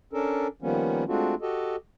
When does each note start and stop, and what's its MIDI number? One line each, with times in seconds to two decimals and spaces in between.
0.13 0.47 61
0.13 0.47 62
0.13 0.47 69
0.13 0.47 70
0.62 1.04 51
0.62 1.04 53
0.62 1.04 55
0.62 1.04 58
0.62 1.04 59
0.62 1.04 61
1.08 1.35 56
1.08 1.35 57
1.08 1.35 60
1.08 1.35 62
1.08 1.35 65
1.08 1.35 66
1.42 1.76 66
1.42 1.76 67
1.42 1.76 69
1.42 1.76 75